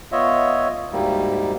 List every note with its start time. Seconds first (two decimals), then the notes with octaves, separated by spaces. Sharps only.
0.12 B3 F4 C#5 D#5 E5
0.92 D2 G#2 G3 A#3